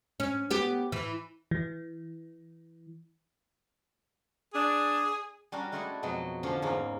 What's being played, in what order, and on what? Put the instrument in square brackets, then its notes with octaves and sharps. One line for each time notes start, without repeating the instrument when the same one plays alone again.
[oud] C#4
B3 G4
E3
[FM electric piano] E3
[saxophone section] D4 [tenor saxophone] G#4
[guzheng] G3 C#4 D4 F#4 A#4
G#3 A3 E4 G#4 A4 D5
F2 B2 F#3 G#3 D#5
D3 F3 C#4 D4 F4
E2 G#2 A#3 C#4